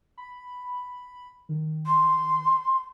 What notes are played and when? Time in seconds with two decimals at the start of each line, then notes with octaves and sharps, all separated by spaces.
0.18 B5
1.49 D#3
1.86 C6